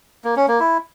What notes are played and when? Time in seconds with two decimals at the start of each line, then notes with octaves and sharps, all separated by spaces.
0.24 A#3
0.36 C#4
0.48 A#3
0.60 E4